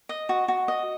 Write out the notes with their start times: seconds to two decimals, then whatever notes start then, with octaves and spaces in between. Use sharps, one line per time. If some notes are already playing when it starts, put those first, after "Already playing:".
0.09 D#5
0.29 F#4
0.48 F#4
0.68 D#5